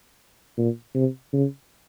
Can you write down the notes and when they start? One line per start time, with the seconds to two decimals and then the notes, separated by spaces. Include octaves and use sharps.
0.58 A#2
0.95 C3
1.33 C#3